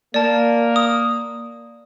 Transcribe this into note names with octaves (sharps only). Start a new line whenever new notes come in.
A#3 D5 A5
D#6